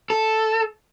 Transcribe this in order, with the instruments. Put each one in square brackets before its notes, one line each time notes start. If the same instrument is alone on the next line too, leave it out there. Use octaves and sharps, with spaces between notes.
[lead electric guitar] A4